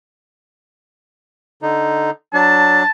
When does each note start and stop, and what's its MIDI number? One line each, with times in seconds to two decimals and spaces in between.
1.62 2.10 50
1.62 2.10 63
2.34 2.83 54
2.34 2.83 62
2.34 2.90 81